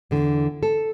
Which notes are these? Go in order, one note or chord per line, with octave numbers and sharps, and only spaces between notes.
E2 D3
A4